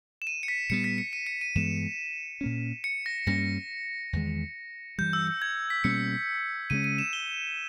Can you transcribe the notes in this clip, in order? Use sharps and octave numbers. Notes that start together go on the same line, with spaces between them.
E7
D#7
C#7
B6
A#2 G3 B3 C#7
B6
C#7
D#7
C#7
D#7
G2 E3 G#3 B3 E7
A#2 A#3 C#4
C#7
A#6
G2 G3 A#3 C#4 A#6
E2 D#3 G#3
G2 E3 G3 G6
E6
G6
G#6
B6
B2 G3 A#3 C#4 C#7
C#3 G#3 C#4 D#7
D#7
E7
G7